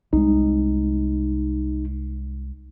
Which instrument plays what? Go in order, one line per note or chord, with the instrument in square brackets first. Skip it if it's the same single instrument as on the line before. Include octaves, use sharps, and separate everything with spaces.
[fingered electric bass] C2 G#3 [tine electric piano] D#4